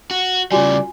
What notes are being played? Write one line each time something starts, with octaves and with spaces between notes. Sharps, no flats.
F#4
C#3 G3 F4 F#4 D5 G#5